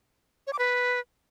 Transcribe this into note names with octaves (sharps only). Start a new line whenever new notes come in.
C#5
D6
B4